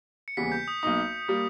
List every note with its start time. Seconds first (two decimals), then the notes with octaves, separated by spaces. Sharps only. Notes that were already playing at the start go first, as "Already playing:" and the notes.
0.28 C#7
0.37 D#2 C#3 E3 G3 B3 B6
0.52 G6
0.68 D#6
0.83 B1 B2 A#3 D#4 D#6
1.28 G3 A#3